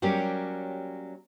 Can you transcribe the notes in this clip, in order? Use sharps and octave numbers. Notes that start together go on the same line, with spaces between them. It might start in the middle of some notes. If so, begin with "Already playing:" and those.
F#3 G3 A#3 C#4 G4